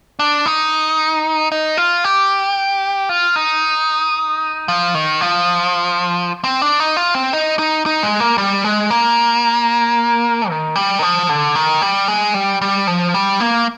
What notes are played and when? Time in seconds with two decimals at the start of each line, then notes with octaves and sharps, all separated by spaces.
0.19 D4
0.46 D#4
1.52 D#4
1.77 F4
2.04 G4
3.09 F4
3.36 D#4
4.68 F3
4.95 D#3
5.21 F3
6.44 C4
6.62 D4
6.80 D#4
6.97 F4
7.14 C4
7.33 D#4
7.59 D#4
7.86 D#4
8.03 G#3
8.20 A#3
8.38 G3
8.64 G#3
8.91 A#3
10.50 D#3
10.76 G3
10.99 D#3
11.02 F3
11.29 D3
11.55 D#3
11.82 G3
12.08 G#3
12.34 G3
12.62 G3
12.87 F3
13.14 G3
13.40 A#3